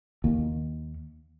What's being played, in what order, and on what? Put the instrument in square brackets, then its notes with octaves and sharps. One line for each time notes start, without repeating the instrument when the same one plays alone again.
[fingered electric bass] D#2